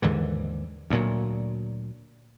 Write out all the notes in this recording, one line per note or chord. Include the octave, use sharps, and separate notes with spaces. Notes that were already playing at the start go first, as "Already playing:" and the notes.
D#2 G#2 D3 E3
D2 A#2 F#3